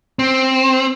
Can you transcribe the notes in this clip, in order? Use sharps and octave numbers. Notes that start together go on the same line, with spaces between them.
C4